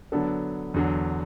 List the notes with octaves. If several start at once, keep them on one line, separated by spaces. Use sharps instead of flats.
D3 F#3 B3 D4 A4
E2 D3 F#3